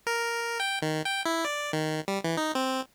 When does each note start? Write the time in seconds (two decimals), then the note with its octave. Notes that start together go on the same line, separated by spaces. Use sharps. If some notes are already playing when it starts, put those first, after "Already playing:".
0.07 A#4
0.60 G5
0.82 D#3
1.05 G5
1.26 E4
1.45 D5
1.73 D#3
2.08 G3
2.24 E3
2.37 D#4
2.55 C4